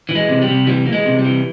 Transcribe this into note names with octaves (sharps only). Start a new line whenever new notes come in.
E3
G#3
C3
G3
C3
E3 G3
E3 A#3
G#3
C3
G3
E3